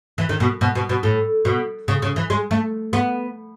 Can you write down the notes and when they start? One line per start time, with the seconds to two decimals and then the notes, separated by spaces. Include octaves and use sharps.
0.18 E3
0.29 D#3
0.40 B2
0.61 B2
0.75 B2
0.89 B2
1.03 A2
1.45 B2
1.88 C#3
2.02 C#3
2.16 E3
2.30 G#3
2.51 A3
2.93 B3